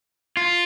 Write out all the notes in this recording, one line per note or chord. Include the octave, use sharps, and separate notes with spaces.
F4